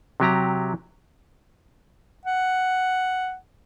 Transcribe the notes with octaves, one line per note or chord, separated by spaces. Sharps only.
C3 F#3 G4 A#5
F#5